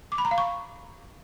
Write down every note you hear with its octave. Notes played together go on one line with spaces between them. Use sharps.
D6
B5
A#5
F5
C#6